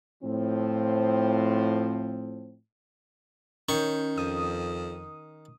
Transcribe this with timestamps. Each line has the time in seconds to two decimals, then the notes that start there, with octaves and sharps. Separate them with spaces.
0.23 A2 F3 C4
3.69 D#3 C#4 C#6 G6
4.18 F2 D#6